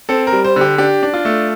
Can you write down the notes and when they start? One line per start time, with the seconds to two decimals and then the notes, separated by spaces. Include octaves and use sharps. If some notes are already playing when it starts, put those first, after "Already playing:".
0.09 C4 A4
0.27 A#4
0.32 G3
0.44 C5
0.56 D3 G4
0.78 D4 G4
1.03 D4
1.14 F4
1.25 A3